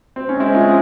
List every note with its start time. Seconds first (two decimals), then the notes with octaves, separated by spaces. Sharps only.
0.16 C4
0.29 C#4
0.40 G#3 C4 E4
0.55 C#4 F4